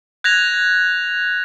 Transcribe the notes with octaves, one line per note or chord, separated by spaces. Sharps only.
F#6 G#6 A#6 F7